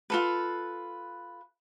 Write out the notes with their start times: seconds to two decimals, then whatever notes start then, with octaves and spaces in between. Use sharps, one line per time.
0.10 F4 A4 B4